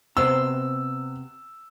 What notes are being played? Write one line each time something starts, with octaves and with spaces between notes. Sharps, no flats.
C3 B3 C5 E6